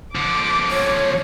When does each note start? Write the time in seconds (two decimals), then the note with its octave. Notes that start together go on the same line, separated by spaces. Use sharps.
0.15 D3 F3 D6
0.71 C#5